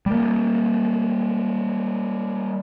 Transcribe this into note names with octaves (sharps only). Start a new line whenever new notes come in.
G3 A#3